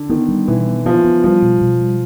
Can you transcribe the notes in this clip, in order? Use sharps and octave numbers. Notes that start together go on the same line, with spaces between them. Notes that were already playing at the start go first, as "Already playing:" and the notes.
Already playing: D3
D#3 B3
G3
B2 E3
B3
F3 B3
B3
F3 G3
B2
B2
G3